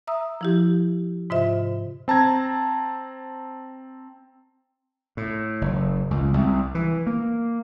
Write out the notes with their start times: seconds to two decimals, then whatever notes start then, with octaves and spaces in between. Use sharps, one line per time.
0.07 E5 A#5 D#6 E6
0.41 F3 E4 G4
1.30 G#2 C3 F4 C5 D#5 E5
2.08 C4 A5 A#5 G#6
5.17 A2
5.61 F#1
6.11 C#2
6.34 C2
6.75 E3
7.07 A#3